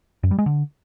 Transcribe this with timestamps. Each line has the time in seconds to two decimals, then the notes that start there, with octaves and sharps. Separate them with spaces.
0.23 F#2
0.31 G3
0.38 G#3
0.46 D3